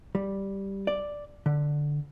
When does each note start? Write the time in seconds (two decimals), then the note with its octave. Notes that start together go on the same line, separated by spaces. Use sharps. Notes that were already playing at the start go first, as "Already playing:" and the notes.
0.15 G3
0.87 D5
1.46 D3